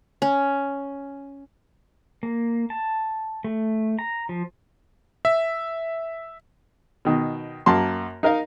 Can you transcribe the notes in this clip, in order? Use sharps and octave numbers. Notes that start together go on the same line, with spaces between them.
C#4
A#3
A5
A3
A#5
F3
E5
B2 D#3
F#2 A#3 A5 C6
D#4 A#4 D#5 F5